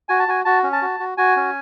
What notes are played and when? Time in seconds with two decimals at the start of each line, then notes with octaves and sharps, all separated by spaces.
0.09 F#4 G#5
0.19 A5
0.28 F#4 G#5
0.45 F#4 A5
0.63 C#4
0.73 A5
0.82 F#4
1.00 F#4
1.18 F#4 G#5
1.37 C#4